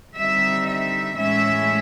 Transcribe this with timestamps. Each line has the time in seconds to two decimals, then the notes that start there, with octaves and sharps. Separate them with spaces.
0.17 D3 G3 C4 D#4 E5
0.68 E5
1.18 A2 E3 G#3 C#4 E5